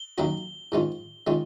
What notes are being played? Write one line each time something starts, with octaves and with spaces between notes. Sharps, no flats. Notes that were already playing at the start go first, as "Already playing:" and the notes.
Already playing: G7
D#3 F#3 A#3 C#4 F#4
G#2 D#3 G#3 C#4 F4
D#3 G#3 C#4 F4